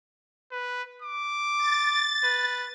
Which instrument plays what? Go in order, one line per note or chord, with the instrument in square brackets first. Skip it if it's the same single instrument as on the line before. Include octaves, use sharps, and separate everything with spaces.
[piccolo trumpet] B4
D6
[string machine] A6
[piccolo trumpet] B4